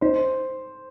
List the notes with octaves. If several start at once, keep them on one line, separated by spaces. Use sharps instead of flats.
D#4 C5